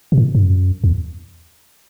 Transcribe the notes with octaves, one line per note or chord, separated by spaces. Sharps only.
B2
A2
G2
F#2
E2